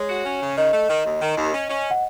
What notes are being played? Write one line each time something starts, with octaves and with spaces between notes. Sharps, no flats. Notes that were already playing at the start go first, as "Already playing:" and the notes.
Already playing: G#3 C#5
F#4
C#4
C#3
D#3 D#5
A3
D#3
D#2
D#3
D#2
C#4
C#4
F#5